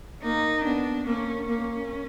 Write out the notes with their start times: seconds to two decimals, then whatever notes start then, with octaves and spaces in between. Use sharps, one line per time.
0.23 A#3 D#4
0.65 B3 D4
1.06 A#3 C#4
1.49 A#3 C#4